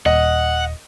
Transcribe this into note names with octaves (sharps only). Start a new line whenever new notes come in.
D#1 D#5 F#5